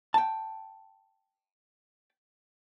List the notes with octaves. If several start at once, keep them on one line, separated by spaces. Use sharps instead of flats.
G5 A5